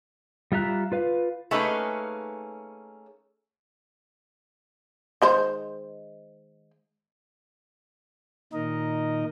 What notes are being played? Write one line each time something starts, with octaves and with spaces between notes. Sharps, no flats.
G3 F4 E5 A#5 F#6
F4 B4 F5
A3 A#3 C#4 D#4 G#4 B4
D#3 G#3 C5
A#2 D#3 D#4 A#4 D#5